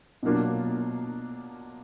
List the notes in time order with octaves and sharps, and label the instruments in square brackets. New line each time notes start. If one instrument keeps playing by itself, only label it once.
[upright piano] B2 F#3 A#3 D4 F4